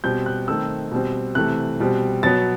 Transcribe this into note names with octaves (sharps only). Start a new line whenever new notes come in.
B2 G3 C4 G6
F#6
D#3 A3 C4 E6
B2 G3 C4
C3 E3 A3 F#6
B2 G3 C4
B2 F#3 B3 A6